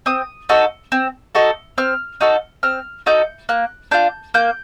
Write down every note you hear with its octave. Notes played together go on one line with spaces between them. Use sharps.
C4 D#6
D#4 F#4 A4
C4
D#4 F#4 A4
C4 F6
D#4 F#4 A4
C4 F6
D#4 F#4 A4 G6
A#3 F#6
D4 F4 G6
A#3 G6